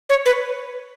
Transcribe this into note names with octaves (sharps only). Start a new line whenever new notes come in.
C#5
B4